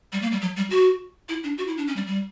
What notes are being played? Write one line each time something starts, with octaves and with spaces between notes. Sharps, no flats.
G3
A#3
G3
F#3
G3
F#4
E4
D4
F#4
E4
D4
C#4
G3
G3